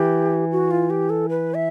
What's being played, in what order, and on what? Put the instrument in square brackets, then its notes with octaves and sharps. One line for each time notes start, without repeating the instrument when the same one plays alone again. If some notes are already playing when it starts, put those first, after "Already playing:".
Already playing: [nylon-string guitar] E3 [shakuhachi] G4
[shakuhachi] F#4
F4
G4
A4
B4
E5